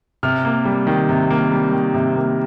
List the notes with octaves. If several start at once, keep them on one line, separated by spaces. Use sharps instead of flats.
C3 F6
A#3
G3
D#3
C3
A#3
G3
D#3
C3
A#3